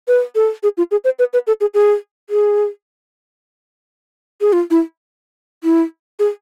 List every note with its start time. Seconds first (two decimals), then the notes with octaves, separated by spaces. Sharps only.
0.08 B4
0.35 A4
0.63 G#4
0.77 F4
0.91 G#4
1.04 C5
1.19 B4
1.33 B4
1.47 A4
1.61 G#4
1.74 G#4
2.30 G#4
4.41 G#4
4.53 F4
4.71 E4
5.64 E4
6.19 G#4